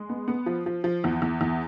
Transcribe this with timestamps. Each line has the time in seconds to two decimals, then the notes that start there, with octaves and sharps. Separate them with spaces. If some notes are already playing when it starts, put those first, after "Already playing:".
Already playing: G#3
0.09 B3
0.28 B3
0.46 F3
0.66 F3
0.84 F3
1.04 E2
1.22 E2
1.41 E2